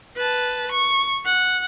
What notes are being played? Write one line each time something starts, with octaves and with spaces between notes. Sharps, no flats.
B4 A5
C#6
F#5